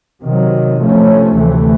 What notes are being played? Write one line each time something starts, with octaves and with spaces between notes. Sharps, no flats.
C3 D#3 F#3
C3 F3 A3 C#4
D2 C3 E3 A3